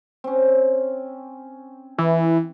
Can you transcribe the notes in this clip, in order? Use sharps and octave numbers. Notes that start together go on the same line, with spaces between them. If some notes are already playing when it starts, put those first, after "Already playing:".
C4 C#4
E3